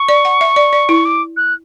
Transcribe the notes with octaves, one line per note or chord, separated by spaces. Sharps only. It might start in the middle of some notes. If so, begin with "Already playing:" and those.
Already playing: C#6
D5
F#5
E5
D5
D5
E4
D6
F#6